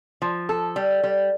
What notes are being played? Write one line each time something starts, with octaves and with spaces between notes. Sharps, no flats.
F3
A4
G3
G3